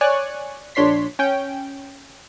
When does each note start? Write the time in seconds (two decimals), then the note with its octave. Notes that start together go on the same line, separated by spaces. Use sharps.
0.01 C#5 D5 G#5 C#6 F#6
0.75 A#1 D4 C#5 C6 B6
1.19 C#4 G5